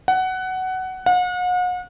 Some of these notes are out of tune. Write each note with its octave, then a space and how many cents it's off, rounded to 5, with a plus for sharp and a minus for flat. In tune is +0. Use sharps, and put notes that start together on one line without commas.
F#5 +15
F#5 -40